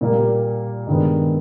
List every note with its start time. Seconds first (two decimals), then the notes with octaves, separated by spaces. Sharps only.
0.01 A#2 G3 A#3
0.87 G2 D#3 G#3 B3